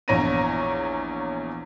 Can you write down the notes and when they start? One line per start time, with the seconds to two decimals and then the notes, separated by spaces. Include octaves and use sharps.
0.08 A#1 E2 C#5 A#5 A#6 D#7